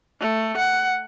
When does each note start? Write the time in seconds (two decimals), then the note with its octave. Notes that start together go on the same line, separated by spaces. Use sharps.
0.20 A3
0.57 F#5